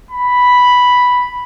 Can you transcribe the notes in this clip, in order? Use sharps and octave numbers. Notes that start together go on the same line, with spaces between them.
B5